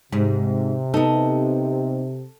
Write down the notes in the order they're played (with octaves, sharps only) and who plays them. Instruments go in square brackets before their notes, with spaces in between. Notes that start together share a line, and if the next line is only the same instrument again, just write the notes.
[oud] G#2 [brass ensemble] C3
[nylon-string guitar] B3 D#4 [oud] A4